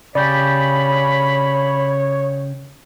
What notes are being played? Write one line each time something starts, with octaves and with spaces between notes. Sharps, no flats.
C#3 G4 C#5 D5 B5